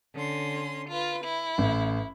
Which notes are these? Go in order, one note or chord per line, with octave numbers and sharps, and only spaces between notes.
D3 C#4 C6
F4 B4
E4
A1